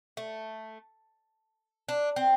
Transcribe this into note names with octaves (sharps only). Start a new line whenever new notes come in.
A3
D4
C4